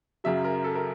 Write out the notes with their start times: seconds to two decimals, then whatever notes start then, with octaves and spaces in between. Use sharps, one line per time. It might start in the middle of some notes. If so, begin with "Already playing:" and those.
0.24 F#2 C#3 F#3 E5
0.45 A#4
0.64 A4
0.75 A#4